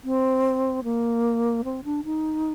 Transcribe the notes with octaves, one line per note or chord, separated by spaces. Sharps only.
C4
A#3
C4
D4
D#4